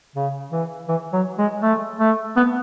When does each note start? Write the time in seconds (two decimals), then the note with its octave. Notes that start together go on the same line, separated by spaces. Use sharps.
0.16 C#3
0.52 E3
0.88 E3
1.13 F#3
1.38 G#3
1.62 A3
2.00 A3
2.36 B3